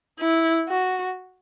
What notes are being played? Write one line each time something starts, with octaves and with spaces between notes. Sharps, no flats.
E4
F#4